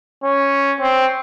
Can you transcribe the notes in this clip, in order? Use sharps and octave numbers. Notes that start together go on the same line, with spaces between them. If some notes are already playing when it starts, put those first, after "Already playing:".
C#4
C4